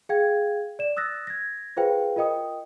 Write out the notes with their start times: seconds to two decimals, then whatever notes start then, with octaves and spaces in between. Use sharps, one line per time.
0.09 G#4 F5 G5 G#6
0.79 D5 E7
0.97 D#6 E6 F#6 A6 A#6
1.27 G#6 A#6
1.77 F4 G#4 B4 C5 F5 G5
2.16 F4 A#4 D#5 G5 D#6